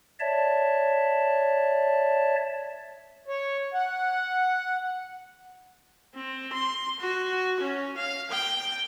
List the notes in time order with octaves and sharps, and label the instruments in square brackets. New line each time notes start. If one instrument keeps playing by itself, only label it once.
[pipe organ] C#5 D5 E5 A5
[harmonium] C#5
F#5
[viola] C4
C6
F#4
C#4
F5
G5